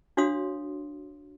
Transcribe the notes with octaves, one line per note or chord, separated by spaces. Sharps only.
D4 F#4 C#5 F5 C6 D#6